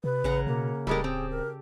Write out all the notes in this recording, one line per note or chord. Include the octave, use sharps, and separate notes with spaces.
C3 B4
A1 C#3 F#5 A#5
B2 A#3
D1 G3 G#3 G4 A4 A#4
C4 G#4
A#4